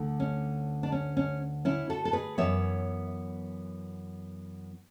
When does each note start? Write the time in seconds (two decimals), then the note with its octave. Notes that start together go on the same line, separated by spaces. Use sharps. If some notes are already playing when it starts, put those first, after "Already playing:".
Already playing: D2 D3
0.20 C#4
0.83 D4
0.92 C#4
1.17 C#4
1.65 C#4 E4
1.90 F#4 A4
2.05 A4
2.13 G#4 B4
2.38 F#2 E3 B3 C#5 E5